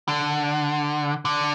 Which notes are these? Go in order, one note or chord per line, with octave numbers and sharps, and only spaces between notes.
D3
D3